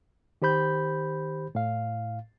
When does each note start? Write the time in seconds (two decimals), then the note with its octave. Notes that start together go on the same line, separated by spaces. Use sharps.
0.42 D#3 G4 C5 B5 G6
1.55 A2 F5